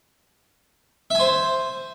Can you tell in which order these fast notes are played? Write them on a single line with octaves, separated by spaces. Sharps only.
E5 G#5 C5